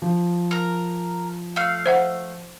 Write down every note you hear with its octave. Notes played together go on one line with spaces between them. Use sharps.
F3
A#4 A#5
A3 F5
C5 E5 F#5